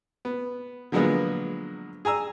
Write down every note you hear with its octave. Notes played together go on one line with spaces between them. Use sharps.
B3
D3 F3 F#3 G#3 A#3 B3
G#4 G#5 A#5 E6